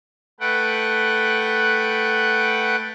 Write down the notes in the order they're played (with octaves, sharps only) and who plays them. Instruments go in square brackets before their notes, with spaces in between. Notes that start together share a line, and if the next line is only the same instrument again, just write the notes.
[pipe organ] A3 B4 F#5 G5